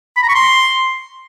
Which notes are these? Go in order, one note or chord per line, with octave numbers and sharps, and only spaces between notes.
B5
A#5
C#6
C6